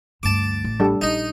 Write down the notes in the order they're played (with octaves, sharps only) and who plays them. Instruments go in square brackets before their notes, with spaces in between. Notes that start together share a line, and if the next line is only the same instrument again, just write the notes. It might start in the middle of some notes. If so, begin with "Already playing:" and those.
[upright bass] D2 G2 [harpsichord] A5 D6
[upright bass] A1
[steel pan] G3 D4 A4
[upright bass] A#1 [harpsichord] D#4